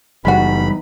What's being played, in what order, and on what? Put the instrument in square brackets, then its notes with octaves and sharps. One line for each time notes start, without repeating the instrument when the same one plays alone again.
[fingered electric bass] F#1 G3 [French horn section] E3 B3 D#4 [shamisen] G#3 F#4 [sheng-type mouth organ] B5